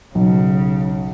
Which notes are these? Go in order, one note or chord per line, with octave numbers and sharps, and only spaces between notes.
B1 C#3